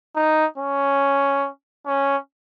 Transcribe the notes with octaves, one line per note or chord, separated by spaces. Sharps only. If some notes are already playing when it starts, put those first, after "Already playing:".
D#4
C#4
C#4